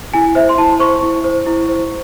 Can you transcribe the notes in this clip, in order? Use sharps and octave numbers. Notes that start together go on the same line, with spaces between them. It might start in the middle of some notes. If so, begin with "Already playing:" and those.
E4 G#5
C5 E5
C6
E4 A5
C5 C#6
E4
C5
E4
C5